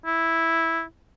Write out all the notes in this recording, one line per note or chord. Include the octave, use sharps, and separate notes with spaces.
E4